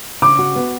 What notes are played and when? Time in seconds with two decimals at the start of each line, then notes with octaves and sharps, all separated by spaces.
0.22 C#3 D6
0.39 F#4
0.55 B3